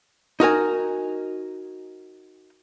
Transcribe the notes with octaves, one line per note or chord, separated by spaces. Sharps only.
D#4 F#4 A#4 G#5